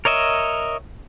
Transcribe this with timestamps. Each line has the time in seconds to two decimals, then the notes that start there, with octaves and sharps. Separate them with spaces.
0.05 A#4 C#5 D#5 E5